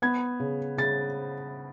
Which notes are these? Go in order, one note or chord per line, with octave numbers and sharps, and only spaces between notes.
B3 G#6
C#3
C#3 A6